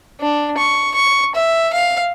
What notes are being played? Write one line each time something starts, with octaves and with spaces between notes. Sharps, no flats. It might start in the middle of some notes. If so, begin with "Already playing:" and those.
D4
C#6
C#6
E5
F5